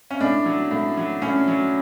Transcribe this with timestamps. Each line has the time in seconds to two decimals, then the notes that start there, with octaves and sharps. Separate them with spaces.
0.10 C#4
0.20 A2 D4
0.46 F#3
0.71 A2
0.97 F#3
1.22 A2 C#4
1.48 F#3